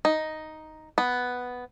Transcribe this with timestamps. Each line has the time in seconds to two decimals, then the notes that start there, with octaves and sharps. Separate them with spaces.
0.05 D#4
0.98 B3